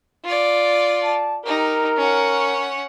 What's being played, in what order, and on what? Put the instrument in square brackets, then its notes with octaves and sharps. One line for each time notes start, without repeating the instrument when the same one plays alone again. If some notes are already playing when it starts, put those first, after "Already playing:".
[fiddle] F4 D5
[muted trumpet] A5
[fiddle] D#4 G4 [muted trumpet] A#4
[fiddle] C#4 F#5